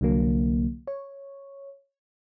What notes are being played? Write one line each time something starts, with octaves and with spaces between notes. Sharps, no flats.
C2 D3 F#3 A#3
C#5